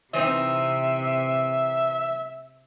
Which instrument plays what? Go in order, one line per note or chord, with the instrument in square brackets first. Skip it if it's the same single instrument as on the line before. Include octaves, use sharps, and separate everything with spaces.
[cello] C3 [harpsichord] E3 C4 D#4 [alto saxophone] E5